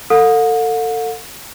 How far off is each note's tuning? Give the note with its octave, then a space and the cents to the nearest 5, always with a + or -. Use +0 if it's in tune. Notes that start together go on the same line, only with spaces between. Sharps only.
A4 +30 F#5 -45